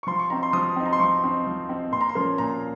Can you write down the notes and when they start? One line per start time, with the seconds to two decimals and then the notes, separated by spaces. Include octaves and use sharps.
0.03 C#6
0.07 F3 C6
0.19 C#6
0.30 C4 D#4 A#5
0.43 C6
0.53 F3 D#6
0.76 C4 D#4
0.86 A#5
0.93 C6
1.00 F3 C#6
1.24 C4 D#4
1.47 F3
1.69 C4 D#4
1.92 A#2 C6
2.01 A#5
2.09 C6
2.15 F3 A#3 C#4
2.38 A#2 A#5